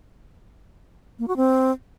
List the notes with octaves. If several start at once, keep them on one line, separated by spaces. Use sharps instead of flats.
A#3
F#4
C4